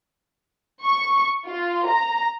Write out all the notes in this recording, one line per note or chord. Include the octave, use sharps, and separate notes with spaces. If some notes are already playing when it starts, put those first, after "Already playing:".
C#6
F4
A#5